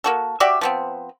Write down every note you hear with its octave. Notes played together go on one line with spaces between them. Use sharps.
A#3 F#4 A4
F#4 G4 D5 E5
F3 B3 C4